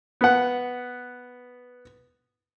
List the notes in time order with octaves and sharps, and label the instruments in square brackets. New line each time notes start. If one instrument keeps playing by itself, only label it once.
[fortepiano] B3 F#5